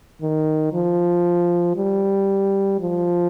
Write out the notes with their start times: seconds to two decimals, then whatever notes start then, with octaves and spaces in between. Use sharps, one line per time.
0.22 D#3
0.73 F3
1.76 G3
2.80 F3